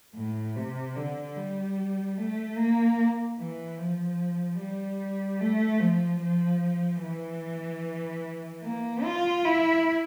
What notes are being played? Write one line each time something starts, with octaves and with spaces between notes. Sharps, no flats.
A2
C3
D3
G3
A3
A#3
E3
F3
G3
A3
F3
F3
E3
A#3
F4
E4